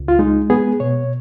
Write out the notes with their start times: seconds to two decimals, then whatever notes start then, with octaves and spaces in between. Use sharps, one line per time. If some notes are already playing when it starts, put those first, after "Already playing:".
Already playing: C#2
0.08 F4
0.19 G#3 D#4
0.50 B3 G#4
0.80 B2 C#5